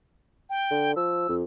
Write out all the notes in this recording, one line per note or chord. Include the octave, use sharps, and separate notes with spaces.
G5
D3
F3 E6
F2